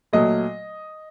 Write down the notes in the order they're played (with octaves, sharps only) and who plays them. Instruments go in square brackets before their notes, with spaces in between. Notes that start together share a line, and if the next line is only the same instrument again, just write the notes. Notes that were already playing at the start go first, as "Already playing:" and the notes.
[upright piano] A#2 F#3 A3 D#5